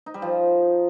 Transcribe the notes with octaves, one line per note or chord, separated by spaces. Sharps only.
D#4
G3
F3